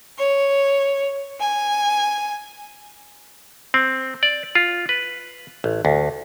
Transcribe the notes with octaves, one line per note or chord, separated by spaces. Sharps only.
C#5
G#5
C4
D5
F4
B4
A1
D2